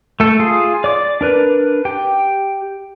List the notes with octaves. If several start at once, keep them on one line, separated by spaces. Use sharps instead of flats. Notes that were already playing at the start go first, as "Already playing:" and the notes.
A3 A4
F4 G#4
D5 D6
D4 A#4 B4
G4 G5